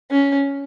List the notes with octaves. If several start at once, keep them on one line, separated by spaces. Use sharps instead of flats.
C#4